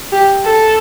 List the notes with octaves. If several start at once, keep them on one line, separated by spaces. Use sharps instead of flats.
G4
A4